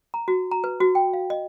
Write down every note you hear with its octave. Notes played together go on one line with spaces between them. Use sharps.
A#5
F#4
A#5
B4
F#4
G5
F5
D#5